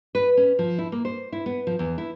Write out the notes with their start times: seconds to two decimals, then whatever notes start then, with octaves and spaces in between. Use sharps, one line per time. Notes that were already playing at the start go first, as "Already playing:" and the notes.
0.15 B4
0.37 C#4
0.59 F3
0.78 E4
0.92 A#3
1.05 C5
1.32 E4
1.46 B3
1.67 F3
1.79 E2
1.98 E4